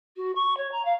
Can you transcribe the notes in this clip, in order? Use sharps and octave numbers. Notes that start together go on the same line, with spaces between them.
F#4
C#6
C#5
A#5
F5